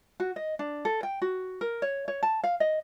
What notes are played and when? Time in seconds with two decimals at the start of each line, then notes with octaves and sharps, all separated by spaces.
0.20 F#4
0.36 D#5
0.59 D4
0.85 A4
1.03 G5
1.22 F#4
1.61 A#4
1.82 C#5
2.08 C#5
2.23 A5
2.44 F5
2.60 D#5